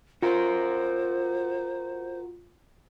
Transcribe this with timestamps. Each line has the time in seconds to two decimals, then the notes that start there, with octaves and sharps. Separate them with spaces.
0.22 F4 F#4 A#4 C5